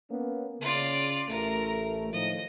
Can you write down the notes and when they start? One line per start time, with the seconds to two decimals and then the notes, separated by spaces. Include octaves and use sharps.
0.10 A#3 B3 C#4
0.61 C#3 F4 D5
1.29 A1 A3 A#4
2.13 A2 D#3 F3 D#5